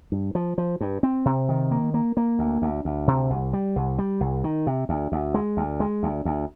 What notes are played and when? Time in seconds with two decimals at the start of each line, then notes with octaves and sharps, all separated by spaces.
0.12 G2
0.35 F3
0.58 F3
0.81 G2
1.03 C4
1.25 C3
1.49 D#3
1.71 A#3
1.94 A#3
2.17 A#3
2.39 D2
2.62 D2
2.85 D2
3.07 C3
3.30 C2
3.53 G3
3.76 C2
3.98 G3
4.21 C2
4.44 D#3
4.67 C3
4.89 D2
5.12 D2
5.34 G#3
5.57 D2
5.80 G#3
6.03 D2
6.25 D2